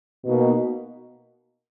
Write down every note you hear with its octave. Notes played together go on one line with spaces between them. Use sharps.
B2 A#3 D#4